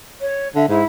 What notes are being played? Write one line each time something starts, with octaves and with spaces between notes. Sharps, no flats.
C#5
D3 E5
G#2 E4